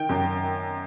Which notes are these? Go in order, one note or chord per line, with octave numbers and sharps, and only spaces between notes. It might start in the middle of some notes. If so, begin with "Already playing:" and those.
Already playing: D#3 G5
F#2